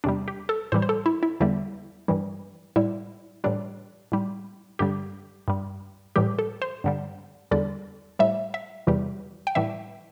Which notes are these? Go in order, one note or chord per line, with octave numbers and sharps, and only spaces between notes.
E2 C3 G3 D4
G4
A4
A2 E3 G3 C5
C5
A4
E4
E4
E2 D3 G3 E4
G2 E3 G3
A2 G3 E4
A2 E3 G3 D4
A2 G3
G2 D3 G3 G4
G2 G3
A2 E3 G3 G4
A4
C5
G2 D3 G3
E2 D3 G3 D5
A2 G3 E5
E5
E2 C3 E3 G3
G5
A2 E3 G3 E5